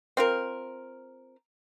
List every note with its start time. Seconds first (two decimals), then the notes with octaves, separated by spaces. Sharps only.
0.17 C4 F4 A#4